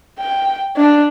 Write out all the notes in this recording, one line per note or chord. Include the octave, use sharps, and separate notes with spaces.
G5
D4